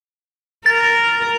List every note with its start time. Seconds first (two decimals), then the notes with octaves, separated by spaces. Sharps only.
0.66 A#4 A6